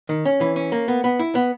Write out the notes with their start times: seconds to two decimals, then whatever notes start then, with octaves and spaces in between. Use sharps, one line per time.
0.09 D#3
0.25 C#4
0.41 E3
0.56 C#4
0.72 A#3
0.88 B3
1.04 B3
1.20 E4
1.35 B3